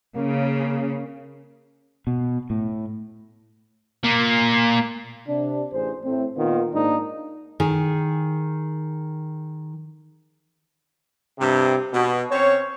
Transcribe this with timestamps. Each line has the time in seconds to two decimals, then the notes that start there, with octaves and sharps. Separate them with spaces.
0.16 C#3 A#3
2.07 B2
2.50 A2
4.04 A#2 A#3
5.27 C3 D4
5.72 A1 G#4 C5
6.03 A2 A3 C4
6.37 A#2 D#3 B3 F4
6.72 G#2 A#3 D4 D#4
7.60 D#3 G#4
11.39 G2 C3
11.93 B2
12.31 C4 C#4 C#5